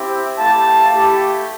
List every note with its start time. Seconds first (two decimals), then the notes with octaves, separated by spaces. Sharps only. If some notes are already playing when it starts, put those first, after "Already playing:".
Already playing: C4 E4 G4
0.38 A3 E4 G4 F5 A5
0.92 A3 E4 G4